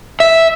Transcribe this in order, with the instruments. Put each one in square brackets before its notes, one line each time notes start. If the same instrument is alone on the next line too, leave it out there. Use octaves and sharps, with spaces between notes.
[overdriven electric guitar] E5